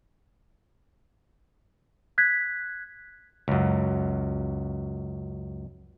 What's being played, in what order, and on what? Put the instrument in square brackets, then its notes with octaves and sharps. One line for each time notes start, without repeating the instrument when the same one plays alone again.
[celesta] F#6 G#6 B6
[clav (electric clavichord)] C#2 F#2